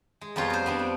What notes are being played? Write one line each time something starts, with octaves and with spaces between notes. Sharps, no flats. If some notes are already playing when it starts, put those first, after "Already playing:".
G#3
F2 G3 B3 F4 C#5 A#5
A#4 C5
B3 C4 D4
G5